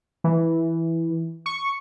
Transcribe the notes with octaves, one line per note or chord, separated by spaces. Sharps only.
E3
C#6